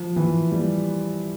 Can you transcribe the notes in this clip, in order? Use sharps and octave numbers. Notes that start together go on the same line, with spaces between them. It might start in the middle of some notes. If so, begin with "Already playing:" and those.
Already playing: F3
E3
G3